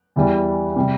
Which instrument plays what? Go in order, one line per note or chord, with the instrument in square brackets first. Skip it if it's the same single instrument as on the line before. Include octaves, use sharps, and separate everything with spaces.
[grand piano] E2 E3 G3
C3 G3